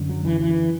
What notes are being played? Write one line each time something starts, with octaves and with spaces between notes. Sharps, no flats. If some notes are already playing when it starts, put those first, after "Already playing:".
Already playing: F#2 D3
F#3
E3
E3